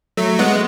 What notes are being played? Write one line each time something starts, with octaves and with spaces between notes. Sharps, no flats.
F#3 A3
G#3 B3